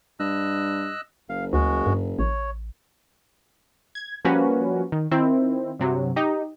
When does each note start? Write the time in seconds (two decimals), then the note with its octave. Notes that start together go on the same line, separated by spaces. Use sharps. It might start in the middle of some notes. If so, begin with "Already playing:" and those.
0.20 G2 D#5 E6 F#6
1.29 F#1 F5
1.53 D2 G#3 F#4
1.87 G2
2.19 A1 C#5
3.95 G#6
4.25 F3 G3 A#3 C#4 F#4 B4
4.92 D#3
5.11 D#3 C4 E4
5.79 G2 C3 F#3
6.16 D#4 G4